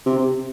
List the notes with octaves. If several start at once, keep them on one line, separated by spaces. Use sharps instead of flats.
C3